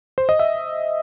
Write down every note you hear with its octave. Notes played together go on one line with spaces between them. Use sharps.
C5
D#5
E5